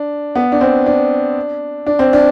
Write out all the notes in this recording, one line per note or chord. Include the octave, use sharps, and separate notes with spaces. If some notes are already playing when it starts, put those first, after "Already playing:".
Already playing: D4
B3
D4
C4
D4
D4
C4
D4